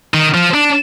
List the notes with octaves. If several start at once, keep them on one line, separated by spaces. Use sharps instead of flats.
D#3
F3
D4